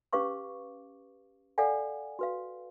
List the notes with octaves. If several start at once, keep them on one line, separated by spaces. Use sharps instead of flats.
C#4 G4 B4 F5 C#6 D6
A4 D5 F5 F#5 G#5
F#4 B4 F5